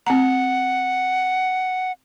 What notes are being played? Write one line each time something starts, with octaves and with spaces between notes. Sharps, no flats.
C4 F#5 A#5